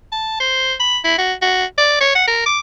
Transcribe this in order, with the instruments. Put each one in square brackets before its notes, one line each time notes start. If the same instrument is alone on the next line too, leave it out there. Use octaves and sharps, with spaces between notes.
[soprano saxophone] A5
C5
B5
E4
F#4
F#4
D5
C#5
F#5
A#4
D6